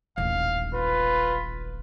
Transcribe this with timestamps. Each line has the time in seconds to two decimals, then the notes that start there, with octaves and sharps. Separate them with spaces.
0.18 D#1 A1 F5
0.74 F4 B4